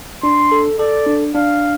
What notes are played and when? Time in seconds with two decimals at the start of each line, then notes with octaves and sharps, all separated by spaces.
0.23 D4 C6
0.52 A4
0.79 A4 D5
1.07 D4
1.35 D4 F5